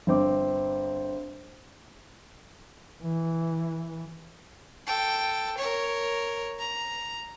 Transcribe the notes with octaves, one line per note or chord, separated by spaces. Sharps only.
G1 C4 D6
E3
A4 G5
A#4 C#5
A#5